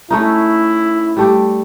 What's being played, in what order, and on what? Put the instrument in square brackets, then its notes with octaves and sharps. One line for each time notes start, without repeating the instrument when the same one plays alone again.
[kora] A3 C#4 D#4 [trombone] E4
[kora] G3 A3 G4